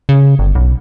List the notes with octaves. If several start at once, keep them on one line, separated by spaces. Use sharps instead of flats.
C#3
G1
B1